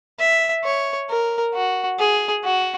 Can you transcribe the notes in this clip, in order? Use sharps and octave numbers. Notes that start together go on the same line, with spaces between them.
E5
C#5
A#4
F#4
G#4
F#4